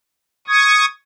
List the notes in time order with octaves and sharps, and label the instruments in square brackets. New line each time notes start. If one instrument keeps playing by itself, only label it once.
[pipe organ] C#6 D#6 [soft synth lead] G#6